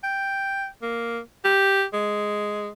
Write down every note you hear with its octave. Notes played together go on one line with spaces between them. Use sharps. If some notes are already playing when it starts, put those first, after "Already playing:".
G5
A#3
G4
G#3